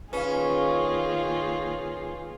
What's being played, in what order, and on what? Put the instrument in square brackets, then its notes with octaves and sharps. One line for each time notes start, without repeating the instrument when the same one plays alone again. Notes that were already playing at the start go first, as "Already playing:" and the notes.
[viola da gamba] D#3 A#3 F4 [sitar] C#4 [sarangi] G#4 [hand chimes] B4 F5